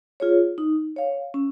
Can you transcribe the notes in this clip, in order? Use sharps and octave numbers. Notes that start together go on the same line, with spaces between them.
F4 G#4 C#5
D#4
C#5 F5
C#4